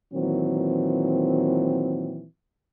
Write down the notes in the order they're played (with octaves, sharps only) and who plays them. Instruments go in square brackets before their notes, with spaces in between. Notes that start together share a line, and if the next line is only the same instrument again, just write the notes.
[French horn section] A#2 D#3 E3 F#3 C4